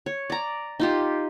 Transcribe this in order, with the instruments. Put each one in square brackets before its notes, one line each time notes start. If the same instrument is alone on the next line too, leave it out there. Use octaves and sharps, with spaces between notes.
[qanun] C#5
D5 A#5
D#4 F4 G4